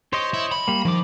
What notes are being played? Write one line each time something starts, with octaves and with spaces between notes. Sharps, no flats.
G4 C5 C#5 D#5
E4
B5
G3 A#3
D#3 F3 D6